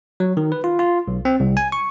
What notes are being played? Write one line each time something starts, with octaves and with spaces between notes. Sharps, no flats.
F#3
D#3
B4
F4
F4
B1
C4
C2
G#5
C#6